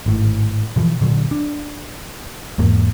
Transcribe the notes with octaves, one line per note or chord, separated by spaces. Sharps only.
G#1 A2
B2 E3 F3
A#2 D3 F#3
D4
E2 G#2 A#3